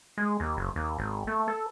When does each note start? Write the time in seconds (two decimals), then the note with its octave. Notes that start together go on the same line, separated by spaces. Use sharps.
0.17 G#3
0.40 D#2
0.57 F#1
0.76 D#2
0.99 G#1
1.27 A3
1.48 A4